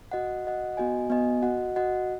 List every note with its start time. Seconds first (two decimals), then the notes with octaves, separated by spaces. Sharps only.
0.12 F#4 D#5 F#5
0.45 F#4 D#5 F#5
0.77 B3 F#4 D#5 G#5
1.10 B3 F#4 D#5 G#5
1.43 F#4 D#5 F#5
1.76 F#4 D#5 F#5